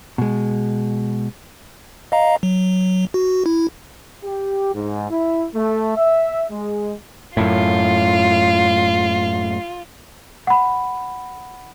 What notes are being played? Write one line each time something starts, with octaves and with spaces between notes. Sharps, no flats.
B2 G#3
D#5 F5 A#5
F#3
F#4
E4
G4
G#2
E4
A3
E5
G#3
F#2 A2 F4
F#5 B5